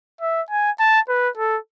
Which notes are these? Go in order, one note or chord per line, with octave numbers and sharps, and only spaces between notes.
E5
G#5
A5
B4
A4